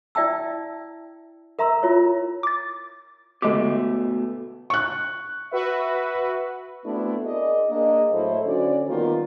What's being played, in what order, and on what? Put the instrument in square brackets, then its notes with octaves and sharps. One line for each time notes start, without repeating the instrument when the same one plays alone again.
[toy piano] E4 D5 E5 G5 A5 E6
A#4 E5 A#5 C6 E6
E4 F4 C#5
[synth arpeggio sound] D6 A6
[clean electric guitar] B2 A3 [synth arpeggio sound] D3 G#3 G4
[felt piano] C#6 F#6
[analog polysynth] F#4 B4 E5
[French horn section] A3 B3 C4 D4 E4 F#4
G#4 A#4 D5 D#5
A#3 D4 G#4 D#5
A2 F#3 E4 A4 C5
D3 C#4 F#4 D5
D#3 G3 A#3 B3 F4 A#4